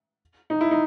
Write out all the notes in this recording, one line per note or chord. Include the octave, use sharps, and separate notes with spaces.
D#4
E4
D#4